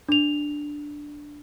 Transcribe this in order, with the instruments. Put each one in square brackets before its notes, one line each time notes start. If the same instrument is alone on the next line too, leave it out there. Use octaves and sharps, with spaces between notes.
[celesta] D4 F7